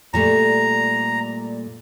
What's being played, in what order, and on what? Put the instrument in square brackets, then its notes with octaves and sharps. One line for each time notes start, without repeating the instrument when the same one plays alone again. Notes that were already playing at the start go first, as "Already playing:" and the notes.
[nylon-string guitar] A#2 G3 A3 [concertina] A#5